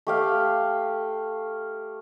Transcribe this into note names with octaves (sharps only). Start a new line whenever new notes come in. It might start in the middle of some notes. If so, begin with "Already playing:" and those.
A3 G4 F5